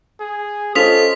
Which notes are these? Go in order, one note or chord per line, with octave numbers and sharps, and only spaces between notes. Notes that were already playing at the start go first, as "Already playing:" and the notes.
G#4
C#4 F4 A4 C5 D#5 D#6 B6 F7